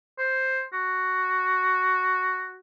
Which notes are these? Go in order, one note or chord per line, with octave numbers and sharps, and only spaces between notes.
C5
F#4